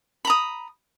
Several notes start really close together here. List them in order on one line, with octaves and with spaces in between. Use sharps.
B5 A#5 D#6